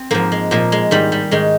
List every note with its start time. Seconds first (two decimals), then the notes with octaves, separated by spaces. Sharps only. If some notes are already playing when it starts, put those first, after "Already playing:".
Already playing: C4
0.11 G#2 F3 A#3
0.32 G#3
0.51 A#2 F3 A#3
0.72 G#3
0.91 G#2 D#3 G3
1.12 G3
1.31 G#2 D#3 G#3